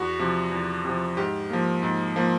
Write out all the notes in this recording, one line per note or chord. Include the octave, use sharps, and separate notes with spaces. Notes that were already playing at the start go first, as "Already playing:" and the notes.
Already playing: E2 F#4
C3 F3
E2
C3 F3
G#2 G4
F3 A#3
G#2
F3 A#3